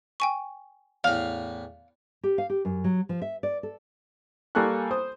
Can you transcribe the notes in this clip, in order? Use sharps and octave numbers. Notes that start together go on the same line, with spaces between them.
G5 G#5 C#6
E2 A2 F5
G4
F5
G4
F#2
F#3
F3
E5
D5
A4
G3 A#3 A4 G#5 C#6 F#6
C5 D#6